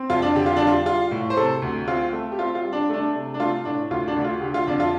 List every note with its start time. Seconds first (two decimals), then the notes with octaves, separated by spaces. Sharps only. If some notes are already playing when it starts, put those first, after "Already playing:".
Already playing: C4
0.10 F2 F4
0.22 D4
0.35 D3 G4
0.46 F4
0.56 G3 D4
0.67 F4
0.86 G3 F4
1.11 A2
1.30 C5
1.36 C3 A4
1.62 D2
1.87 C4 F4
2.13 A3
2.32 G4
2.38 C4 F4
2.55 F4
2.64 G3
2.73 D4
2.90 A3 D4
3.14 C3
3.34 D4
3.40 A3 F4
3.65 A2 D4
3.91 D2 F4
4.08 D4
4.16 D2
4.24 F4
4.42 D3 G4
4.54 F4
4.67 F2 D4
4.80 F4